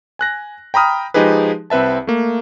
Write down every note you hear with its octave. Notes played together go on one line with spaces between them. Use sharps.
G#5 F#6 A#6
G5 A#5 B5 D#6 F6
F3 G#3 D#4 G4 G#4 B4
C2 C4 B4 E5 A5
A3 A#3